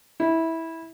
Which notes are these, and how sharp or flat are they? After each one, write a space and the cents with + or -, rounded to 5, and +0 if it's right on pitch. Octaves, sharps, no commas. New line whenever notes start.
E4 -15